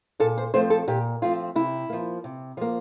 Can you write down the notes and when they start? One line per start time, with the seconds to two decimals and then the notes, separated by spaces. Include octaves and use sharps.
0.20 A#2 A4
0.38 C5
0.54 F3 A3 C4 C5
0.70 A4
0.88 A#2 G4
1.22 F3 A3 C4 F4
1.56 C3 E4
1.89 F3 A#3
2.24 C3
2.57 F3 A#3